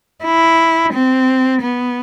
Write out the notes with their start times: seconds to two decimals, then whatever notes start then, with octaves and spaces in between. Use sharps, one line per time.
0.24 E4
0.93 C4
1.61 B3